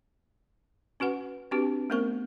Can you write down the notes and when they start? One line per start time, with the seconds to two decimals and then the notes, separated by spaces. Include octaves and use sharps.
1.00 C#4 F#4 B4 F#5
1.51 C4 D4 F#4 G4 B4
1.90 A3 B3 C#4 A#4 C5 C#6